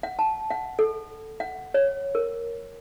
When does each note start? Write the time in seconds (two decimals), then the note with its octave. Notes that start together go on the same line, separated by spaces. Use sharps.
0.03 F#5
0.19 A5
0.50 F#5
0.79 A4
1.40 F#5
1.74 C#5
2.15 A#4